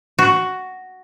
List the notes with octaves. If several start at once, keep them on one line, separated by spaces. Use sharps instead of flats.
F#4